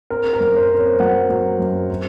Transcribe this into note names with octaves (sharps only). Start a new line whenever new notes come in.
C4 A#4
A#4
F#2
C5
C4
C#5
F#3 F#5
F#3
F#2
C4